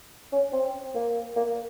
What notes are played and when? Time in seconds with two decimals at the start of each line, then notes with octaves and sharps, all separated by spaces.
0.33 C#4
0.53 C4
0.95 A#3
1.36 A#3